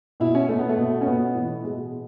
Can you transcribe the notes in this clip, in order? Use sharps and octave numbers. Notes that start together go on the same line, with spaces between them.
B2 E4
C#4
B2 A3
B3
A3
B2
C#4
B2 B3
A2 E3
B2 G#3